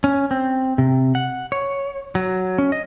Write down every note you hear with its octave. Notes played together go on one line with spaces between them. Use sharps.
C#4
C4
C3
F#5
C#5
F#3
C#4
D#5